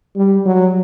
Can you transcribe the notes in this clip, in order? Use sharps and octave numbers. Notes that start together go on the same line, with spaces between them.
G3
F#3